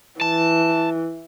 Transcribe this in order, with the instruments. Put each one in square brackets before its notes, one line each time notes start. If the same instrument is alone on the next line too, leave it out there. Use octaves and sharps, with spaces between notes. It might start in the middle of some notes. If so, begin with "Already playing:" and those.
[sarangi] E3 [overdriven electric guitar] A5